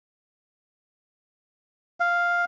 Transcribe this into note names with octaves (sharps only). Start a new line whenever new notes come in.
F5